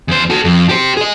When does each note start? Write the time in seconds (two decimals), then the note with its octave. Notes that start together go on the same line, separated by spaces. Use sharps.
0.08 E2 C5
0.30 F#4 A4
0.45 F2
0.69 G4 C5
0.97 G#4 D#5